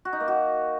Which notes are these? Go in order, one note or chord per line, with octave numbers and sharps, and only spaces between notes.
F#4
D#4
A#3
F#4